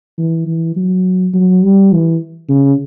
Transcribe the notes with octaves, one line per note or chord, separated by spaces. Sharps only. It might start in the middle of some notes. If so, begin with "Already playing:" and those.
E3
E3
F#3
F#3
G3
E3
C#3